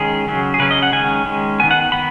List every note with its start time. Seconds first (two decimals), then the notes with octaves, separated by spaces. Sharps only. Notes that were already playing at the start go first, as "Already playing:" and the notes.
Already playing: D#3 G#3 C#4 G#4
0.27 C#3 F#3 C#4
0.54 G#4
0.59 C#3 F#3 C#4 B4
0.71 D#5
0.83 F#5
0.93 D#3 G#3 C#4 G#5
1.26 D#3 G#3 C#4
1.60 B3 G#5
1.64 D#3
1.71 F#5
1.92 D#3 B3 B5